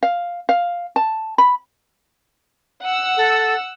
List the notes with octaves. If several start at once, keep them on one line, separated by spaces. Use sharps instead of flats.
F5
F5
A5
B5
F#5 E6
A4